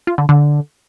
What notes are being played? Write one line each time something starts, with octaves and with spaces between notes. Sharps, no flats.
F4
D3
D3